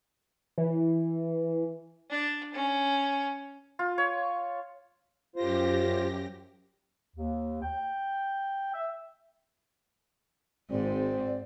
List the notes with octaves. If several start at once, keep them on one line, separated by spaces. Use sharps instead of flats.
E3
D4
C#4
F4
C#5
F#2 F4 G4 C5 A#6
D#2
G5
E5
G#1 G#2 C4 D5